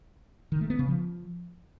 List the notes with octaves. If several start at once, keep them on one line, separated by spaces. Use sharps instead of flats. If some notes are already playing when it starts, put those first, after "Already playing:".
D#3
A3
B3
C#3
F3